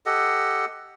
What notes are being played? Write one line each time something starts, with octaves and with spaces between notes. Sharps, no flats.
G4 A4 D#5 F#5